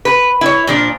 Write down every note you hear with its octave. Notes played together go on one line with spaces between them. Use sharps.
B4
E4 C#5
A#2 F3 D4